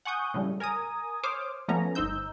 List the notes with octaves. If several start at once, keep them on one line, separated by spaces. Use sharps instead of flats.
F#5 G#5 C#6 D#6 G6
A2 C#3 G3
A#4 G#5 A#5 D#6
C5 C#5 D6 D#6 F6
F3 A3 B3 C#4 A#5
G1 D#4 C5 E6 G6